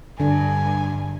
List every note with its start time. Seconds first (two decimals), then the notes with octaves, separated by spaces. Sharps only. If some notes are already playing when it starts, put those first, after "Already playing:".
0.20 G2 D3 D4 G#5